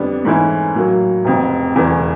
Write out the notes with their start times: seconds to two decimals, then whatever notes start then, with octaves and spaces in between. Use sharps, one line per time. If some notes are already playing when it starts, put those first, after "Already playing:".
Already playing: F2 D3 G3 B3 D4
0.25 G#2 E3 A3 C#4 E4
0.75 A2 F#3 A#3
1.24 F1 F2 C#3
1.75 E1 E2 C#3 E3 A3